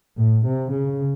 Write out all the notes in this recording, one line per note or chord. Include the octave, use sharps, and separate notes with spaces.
A2
C3
C#3